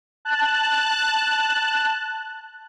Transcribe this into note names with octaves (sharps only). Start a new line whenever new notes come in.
A5 F#6